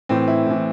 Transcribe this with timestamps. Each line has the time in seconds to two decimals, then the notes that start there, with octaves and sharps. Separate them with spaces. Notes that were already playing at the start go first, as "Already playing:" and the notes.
0.09 A2 E3 C4
0.28 E4
0.46 A2 E3